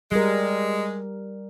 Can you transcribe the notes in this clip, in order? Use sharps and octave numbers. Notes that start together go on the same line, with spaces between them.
G3 G#3 A#4